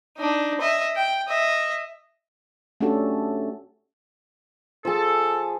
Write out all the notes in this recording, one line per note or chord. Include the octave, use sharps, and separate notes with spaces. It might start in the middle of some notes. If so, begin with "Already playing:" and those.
D4 D#4
D#5 E5
G5
D#5 E5
A3 C#4 D4 F#4 G4 A4
F3 G#4 A4